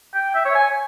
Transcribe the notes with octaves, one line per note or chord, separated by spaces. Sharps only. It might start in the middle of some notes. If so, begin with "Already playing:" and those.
G5
E5
C#5
G#5